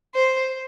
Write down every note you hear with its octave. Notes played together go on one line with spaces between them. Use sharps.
C5